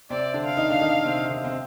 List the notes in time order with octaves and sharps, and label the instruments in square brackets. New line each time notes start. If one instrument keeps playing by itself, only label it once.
[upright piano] C3 C4 [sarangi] D5
[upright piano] D3 D4
[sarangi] F5
[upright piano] D#3 D#4
D4
D#3 D#4
C3 C4
D#3 D#4
C4